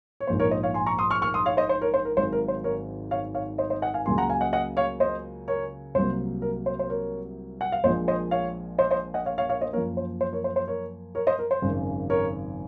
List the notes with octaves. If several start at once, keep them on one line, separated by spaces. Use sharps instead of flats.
C#5
A#1 G#2 F3 A#3 C5
A#4 C#5
C5 D#5
C#5 F5
G#5 C6
A#5 C#6
C6 D#6
C#6 F6
C#6 F6
C6 D#6
C#5 F5
C5 D#5
C5
A#4 C#5
C5
A#4
G#1 G#2 F#3 C5
A#4
C5
A#4 C#5
C#5 F5
C#5 F5
C5 D#5
C5 D#5
D#5 F#5
F5 G#5
C#2 C#3 F#3 A#3 G#5 C6
F#5 A#5
F5 G#5
D#5 F#5
D#5 F#5
C#5 F5
C5 D#5
A#4 C#5
C2 C3 F#3 A#3 C5
A#4
C5
C5
A#4 C#5
F#5
F5
A#1 A#2 F3 G#3 C5 D#5
C5 D#5
C#5 F5
C5 D#5
C5 D#5
D#5 F#5
C#5 F5
C#5 F5
C#5 F5
C5 D#5
F#2 F3 A#3 A#4 C#5
C5
C5
A#4 C#5
C5
C5
A#4 C#5
A#4 C#5
C5 D#5
A#4
C5
G#1 F#2 C#3
A#4 C#5